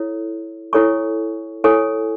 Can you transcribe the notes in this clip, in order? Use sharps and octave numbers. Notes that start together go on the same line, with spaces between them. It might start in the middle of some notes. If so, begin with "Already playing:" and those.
Already playing: E4 A4 C#5
E4 A4 C#5 G#5 C#6
E4 A4 C#5 G#5 C#6